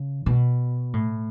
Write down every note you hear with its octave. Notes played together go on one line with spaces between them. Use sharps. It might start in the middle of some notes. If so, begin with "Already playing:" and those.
Already playing: C#3
B2
A2